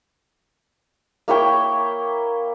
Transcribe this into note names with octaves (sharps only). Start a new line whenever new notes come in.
A#3 E4 C#5 G5